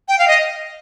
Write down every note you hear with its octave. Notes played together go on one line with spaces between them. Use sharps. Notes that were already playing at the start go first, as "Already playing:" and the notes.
G5
F5
D#5